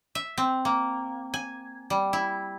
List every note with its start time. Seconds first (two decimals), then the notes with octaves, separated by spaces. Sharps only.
0.15 E5
0.38 C4
0.65 A#3
1.34 G#5
1.90 G3
2.13 E4